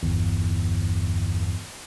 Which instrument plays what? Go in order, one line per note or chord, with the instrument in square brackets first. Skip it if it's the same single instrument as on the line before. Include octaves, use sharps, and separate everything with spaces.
[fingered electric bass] G1 E2